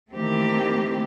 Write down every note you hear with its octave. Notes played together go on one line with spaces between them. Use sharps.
D#3 E3 A3 A#3 C4 G4